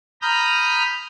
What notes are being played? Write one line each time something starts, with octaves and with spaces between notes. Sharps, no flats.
A#5 B5 D#6 F6 G6